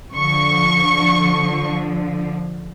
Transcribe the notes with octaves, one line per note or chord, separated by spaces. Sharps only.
D3 F3 C#6